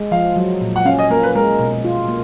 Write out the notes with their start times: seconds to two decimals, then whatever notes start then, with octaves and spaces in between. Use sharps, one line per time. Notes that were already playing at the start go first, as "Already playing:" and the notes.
Already playing: G#3
0.11 F3 F5
0.36 F#3
0.61 A#2
0.76 F#5
0.85 C#4 F5
0.99 D#5
1.10 A#3 A#4
1.23 B4
1.35 G#3 A#4
1.59 B2
1.84 F4
2.08 A#3